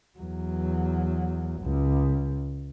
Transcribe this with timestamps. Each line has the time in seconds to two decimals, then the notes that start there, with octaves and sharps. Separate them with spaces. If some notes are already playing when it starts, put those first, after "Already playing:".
0.19 E2 F#3
1.62 C#2